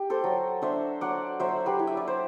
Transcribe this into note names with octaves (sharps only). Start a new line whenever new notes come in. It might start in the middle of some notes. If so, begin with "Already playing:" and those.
Already playing: G4
A4 C5
F#3
D4 C5 E5
F#3 D5 F#5
F#3 C5 E5
G4 B4
E4
E5
D5
C5